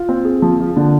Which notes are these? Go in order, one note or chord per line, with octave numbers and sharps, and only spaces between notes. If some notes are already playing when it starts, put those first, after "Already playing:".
Already playing: F4
C4
G#4
F3
F4
D3